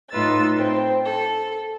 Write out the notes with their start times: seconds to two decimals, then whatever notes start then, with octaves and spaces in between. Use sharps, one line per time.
0.11 A2 D#4 F4 B4 E6 A6
0.58 C4
1.06 A4